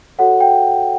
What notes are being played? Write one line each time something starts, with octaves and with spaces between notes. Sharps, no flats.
F#4 A4 C#5 F#5
G5